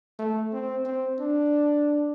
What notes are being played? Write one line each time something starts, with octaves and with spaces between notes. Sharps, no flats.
A3
C4
C4
D4